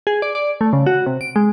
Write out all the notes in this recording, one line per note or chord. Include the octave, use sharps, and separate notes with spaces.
G#4
D5
D5
A3
C#3
F#4
C3
D7
G#3